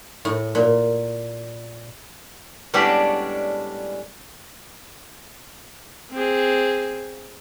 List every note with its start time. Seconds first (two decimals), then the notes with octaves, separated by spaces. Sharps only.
0.25 A2
0.55 A#2
2.74 A2 G3 G#3 B3 C#4 D4
6.12 C4 G#4